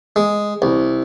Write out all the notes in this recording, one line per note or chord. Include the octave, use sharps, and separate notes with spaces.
G#3
C2